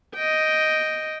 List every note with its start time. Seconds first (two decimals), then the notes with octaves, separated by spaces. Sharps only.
0.15 D#5 G5